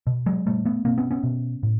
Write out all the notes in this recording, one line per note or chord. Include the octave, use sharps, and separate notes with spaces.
B2
F#3 G#3
A#2 G3 A3
A3 B3
B2 A#3 C4
B3 C#4
B3 C#4
B2
A2